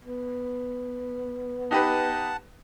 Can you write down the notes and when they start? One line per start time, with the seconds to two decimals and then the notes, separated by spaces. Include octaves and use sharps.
0.04 B3
1.71 D#4 G4 B4 F#5 A5